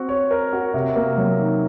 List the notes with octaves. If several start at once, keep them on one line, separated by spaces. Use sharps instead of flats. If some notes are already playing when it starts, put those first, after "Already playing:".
Already playing: C4 F#4
C#5
A#4
F#4
C3
A#3
F#3
D#3